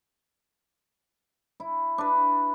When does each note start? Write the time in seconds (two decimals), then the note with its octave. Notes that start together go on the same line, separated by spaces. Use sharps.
1.60 E4
1.98 D4 B4